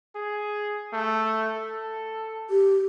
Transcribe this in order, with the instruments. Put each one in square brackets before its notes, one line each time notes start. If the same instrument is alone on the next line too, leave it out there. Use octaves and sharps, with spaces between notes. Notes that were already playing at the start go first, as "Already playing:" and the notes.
[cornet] G#4
A3
A4
[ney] G4